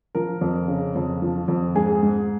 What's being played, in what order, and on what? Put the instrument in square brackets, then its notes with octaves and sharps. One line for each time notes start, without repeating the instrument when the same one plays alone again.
[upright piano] F3 A#4
F2
C#3
F2
F3
F2
G#2 G#4
G#2